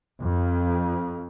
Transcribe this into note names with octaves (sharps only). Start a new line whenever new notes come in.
F2